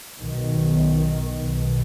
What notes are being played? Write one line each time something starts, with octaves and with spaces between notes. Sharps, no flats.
B1 B2 D#3
B1 B2